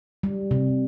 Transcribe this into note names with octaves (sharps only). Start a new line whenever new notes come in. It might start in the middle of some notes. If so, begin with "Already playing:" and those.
G3
C3